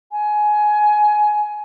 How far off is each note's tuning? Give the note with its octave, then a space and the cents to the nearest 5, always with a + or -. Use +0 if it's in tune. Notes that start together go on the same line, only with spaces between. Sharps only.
G#5 +20